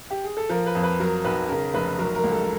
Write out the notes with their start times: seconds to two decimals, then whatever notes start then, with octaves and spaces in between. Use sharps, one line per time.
0.10 G4
0.24 G#4
0.37 A4
0.49 F3 A#4
0.66 B4
0.75 F2
0.83 B4
1.00 F#3 A#4
1.24 B1 B4
1.49 C#3 A#4
1.74 F1 B4
1.99 F#3 A#4
2.15 A#4
2.24 C#2
2.32 A4